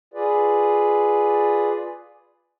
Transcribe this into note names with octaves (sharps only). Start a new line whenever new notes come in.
F4 G#4 B4 D5